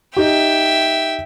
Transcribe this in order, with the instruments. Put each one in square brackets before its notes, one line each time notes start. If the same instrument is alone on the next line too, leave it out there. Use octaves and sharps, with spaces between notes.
[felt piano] D#4 G4 [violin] E5 G5